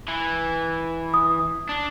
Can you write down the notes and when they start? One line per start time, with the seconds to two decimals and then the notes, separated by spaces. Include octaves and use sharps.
0.08 E3
1.14 D#6
1.69 D4